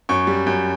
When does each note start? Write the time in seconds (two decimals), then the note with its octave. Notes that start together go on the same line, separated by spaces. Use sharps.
0.09 F#2 C#6
0.27 G3
0.47 F#2